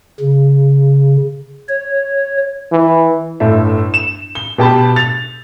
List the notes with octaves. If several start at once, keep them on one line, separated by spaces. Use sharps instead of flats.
C#3
C#5
E3
G1 A2 A4 E5
E7
G7
B2 G4 A5 B5
A6 F7